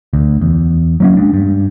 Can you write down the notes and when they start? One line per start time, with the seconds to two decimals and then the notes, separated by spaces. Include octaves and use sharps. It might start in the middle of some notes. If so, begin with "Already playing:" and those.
0.13 D2
0.41 E2
1.00 F#3 A#3 C#4
1.17 G#3 D4
1.34 G2